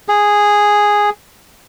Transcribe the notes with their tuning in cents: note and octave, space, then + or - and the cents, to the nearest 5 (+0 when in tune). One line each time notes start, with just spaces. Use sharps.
G#4 -5